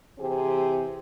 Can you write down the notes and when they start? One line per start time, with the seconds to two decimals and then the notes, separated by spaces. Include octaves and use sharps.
0.19 C3 E3 C4 G4 G#4